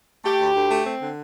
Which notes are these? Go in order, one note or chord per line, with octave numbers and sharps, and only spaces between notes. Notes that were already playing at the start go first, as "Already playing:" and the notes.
A3 G4
D2
D2
A3
C4
D3